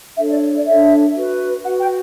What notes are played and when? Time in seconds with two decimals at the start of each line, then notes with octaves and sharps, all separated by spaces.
0.16 D4 A4 C#5 E5
0.28 D5
0.54 D5
0.65 D4 A4 C#5 E5
1.13 F#4 B4
1.62 F#4 B4 F#5
1.80 G5